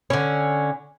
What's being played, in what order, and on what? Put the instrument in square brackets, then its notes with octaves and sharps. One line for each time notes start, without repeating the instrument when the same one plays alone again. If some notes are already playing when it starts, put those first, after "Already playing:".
[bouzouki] D3 C#4